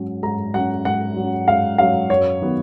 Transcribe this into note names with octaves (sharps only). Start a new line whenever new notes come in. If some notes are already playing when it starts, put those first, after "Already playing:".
Already playing: G#2 F#3 C#4
G#2 A#5
F#3 C#4 F#5
G#2 F#5
F#3 C#4
G#2 F5
F#3 C#4 F5
F#2 C#5
D#3 F#3 B3